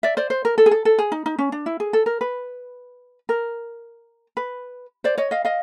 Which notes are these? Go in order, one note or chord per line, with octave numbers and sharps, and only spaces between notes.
D5 E5
C5 D5
C5
A#4
A4
G#4
A4
A4
G#4
D#4
D#4
C#4
D4
E4
G#4
A4
A#4
B4
A#4
B4
C5 D5
C#5 D#5
D#5 F5
D#5 F5